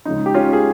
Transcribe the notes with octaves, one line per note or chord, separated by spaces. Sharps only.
C#2 C#3 F3 D#4
G4
C#4 F4
G#4